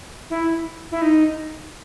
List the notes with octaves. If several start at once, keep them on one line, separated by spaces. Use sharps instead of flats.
E4
E4
D#4